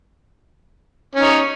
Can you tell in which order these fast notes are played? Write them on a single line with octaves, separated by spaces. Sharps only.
C#4 D#4 C#5